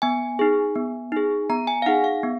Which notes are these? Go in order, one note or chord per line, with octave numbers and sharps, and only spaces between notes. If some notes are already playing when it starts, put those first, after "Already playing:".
B3 G#5
D#4 G#4
B3
D#4 G#4
B3 A#5
G#5
F5
D#4 G#4 F#5
F5
B3